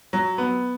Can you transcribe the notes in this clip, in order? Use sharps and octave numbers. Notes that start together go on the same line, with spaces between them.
F#3
B3